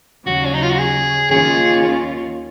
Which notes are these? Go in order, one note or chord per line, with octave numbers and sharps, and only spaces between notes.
D#2 C#3 F#3 F#4
C#4
D#4
F4
F#4
G#4
D#2 D#3 A#3 C#4 F4 G#4